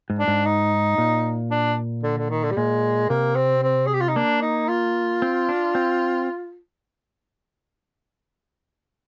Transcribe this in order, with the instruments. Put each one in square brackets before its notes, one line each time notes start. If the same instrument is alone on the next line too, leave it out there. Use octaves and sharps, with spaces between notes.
[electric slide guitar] G#2
[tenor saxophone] D4
[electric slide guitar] G#2
[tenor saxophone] D#4
[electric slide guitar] A#2
[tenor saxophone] D4
D3
D3
D#3
D3
G3
[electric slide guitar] A#2 [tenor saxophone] G#3
[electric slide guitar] C3 [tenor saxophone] A#3
[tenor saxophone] C4
C4
G#4
G4
F4
D#4
[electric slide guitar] A#3 [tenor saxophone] D4
[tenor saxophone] D#4
F4
[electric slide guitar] C4
D4
C4